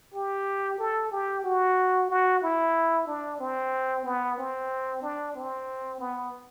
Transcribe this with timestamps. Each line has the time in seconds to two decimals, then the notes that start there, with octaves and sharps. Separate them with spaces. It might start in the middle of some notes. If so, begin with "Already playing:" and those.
0.14 G4
0.79 A4
1.12 G4
1.44 F#4
2.10 F#4
2.43 E4
3.07 D4
3.40 C4
4.05 B3
4.38 C4
5.03 D4
5.36 C4
6.00 B3